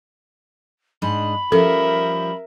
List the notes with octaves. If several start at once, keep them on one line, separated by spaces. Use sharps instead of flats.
G#2 D4 D#5 B5
F3 G3 C#4 A4 A#4 E5